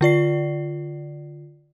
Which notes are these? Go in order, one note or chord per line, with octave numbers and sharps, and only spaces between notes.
D3 F4 D5 C7